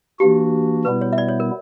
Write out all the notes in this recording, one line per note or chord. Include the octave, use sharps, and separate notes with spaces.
E3 A#3 D4 F#4 G4
B2 G3 B3 E4 B4
C#5
E5
D5
C#5
A#4